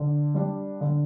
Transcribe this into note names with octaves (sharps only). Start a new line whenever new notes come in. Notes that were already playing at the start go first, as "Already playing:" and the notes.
Already playing: D3
G3 D4
D3